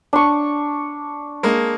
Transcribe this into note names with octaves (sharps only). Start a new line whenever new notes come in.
D4 C#6
G#3 A#3